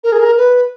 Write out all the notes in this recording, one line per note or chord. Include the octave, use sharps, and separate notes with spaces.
A#4
G#4
A#4
B4